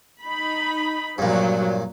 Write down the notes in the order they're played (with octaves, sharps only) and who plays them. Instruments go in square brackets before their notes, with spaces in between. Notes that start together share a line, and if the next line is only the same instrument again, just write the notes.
[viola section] D#4 B5
[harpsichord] G2 A#2 [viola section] F3 F#3